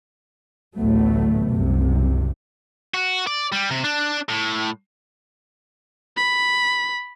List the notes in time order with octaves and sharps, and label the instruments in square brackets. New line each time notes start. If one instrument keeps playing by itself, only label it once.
[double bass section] A1 D2 A2 F#3 A3 B3
C2 F#2 C3
[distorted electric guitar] F#4
D5
G3
C3
D4
A2
[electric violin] B5